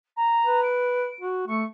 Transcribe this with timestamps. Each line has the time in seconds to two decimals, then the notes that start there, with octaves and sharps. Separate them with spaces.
0.16 A#5
0.46 B4
0.63 D7
1.21 F#4
1.48 A3 C#6